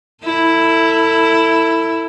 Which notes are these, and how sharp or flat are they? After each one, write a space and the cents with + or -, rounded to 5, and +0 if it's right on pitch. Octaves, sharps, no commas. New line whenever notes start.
E4 +0 A4 +30